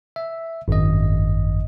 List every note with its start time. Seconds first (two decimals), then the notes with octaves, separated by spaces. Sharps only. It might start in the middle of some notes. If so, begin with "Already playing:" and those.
0.16 E5
0.68 G#1 F#2 D#5